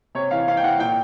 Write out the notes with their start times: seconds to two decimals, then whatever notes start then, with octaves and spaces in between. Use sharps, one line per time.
0.15 C3 C#5
0.31 E3 F5
0.47 C3 F5
0.57 G5
0.63 E3 F#5
0.79 A#2 G5